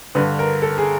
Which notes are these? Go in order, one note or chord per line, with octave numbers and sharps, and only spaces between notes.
G2 D3 B4
A#4
A4
G#4